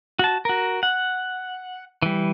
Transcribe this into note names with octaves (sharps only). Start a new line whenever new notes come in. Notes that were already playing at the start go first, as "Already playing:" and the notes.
F#4 A5
F#4 A#4
F#5
E3 G3